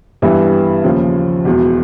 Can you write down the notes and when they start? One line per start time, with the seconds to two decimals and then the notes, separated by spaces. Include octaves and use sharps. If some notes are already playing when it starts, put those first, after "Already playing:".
0.22 G2 E3 G3 B3 E4
0.84 D#2 C#3 F3
1.45 E1 E2 B2